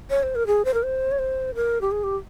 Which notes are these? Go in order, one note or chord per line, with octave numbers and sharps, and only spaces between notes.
C#5
C5
A#4
G#4
C5
A#4
C5
C#5
C5
A#4
G4
G#4
G4